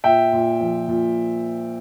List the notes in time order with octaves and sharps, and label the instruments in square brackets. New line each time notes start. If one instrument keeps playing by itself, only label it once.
[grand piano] A#2 E5 G5
A#2
F3
A#2